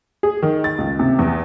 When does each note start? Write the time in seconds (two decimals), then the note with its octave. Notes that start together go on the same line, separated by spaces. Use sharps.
0.23 G#4
0.42 D#3
0.64 A6
0.78 C#2
0.99 C3
1.19 E2